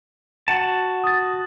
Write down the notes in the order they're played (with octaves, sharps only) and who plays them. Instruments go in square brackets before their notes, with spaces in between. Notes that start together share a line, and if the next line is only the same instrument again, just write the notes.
[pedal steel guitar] F#4 F#5 A5
[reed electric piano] D#6 A6